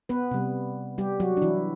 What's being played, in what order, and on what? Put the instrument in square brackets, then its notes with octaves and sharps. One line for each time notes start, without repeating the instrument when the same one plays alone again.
[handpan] B3 B4
C3 G3
G3 G4
F#3 F#4
D4
E3 E4